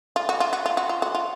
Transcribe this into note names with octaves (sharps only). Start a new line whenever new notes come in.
F4
F#4
F4
F#4
F4
F#4
F4
F#4
F4